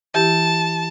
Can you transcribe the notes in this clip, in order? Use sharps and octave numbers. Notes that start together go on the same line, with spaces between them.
E3 E4 G4 A5